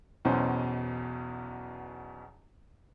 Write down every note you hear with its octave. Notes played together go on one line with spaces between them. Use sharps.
B1 E2 B2 C#4 C5